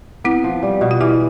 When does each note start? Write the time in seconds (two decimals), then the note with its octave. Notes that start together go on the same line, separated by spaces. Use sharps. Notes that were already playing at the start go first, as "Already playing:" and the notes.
0.24 B3 C4 E4
0.44 F3
0.63 G3
0.81 B2
0.91 F4
1.01 E3 E4 G4